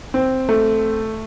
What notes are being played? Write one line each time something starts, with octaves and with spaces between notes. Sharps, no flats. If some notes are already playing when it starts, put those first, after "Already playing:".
C4
A3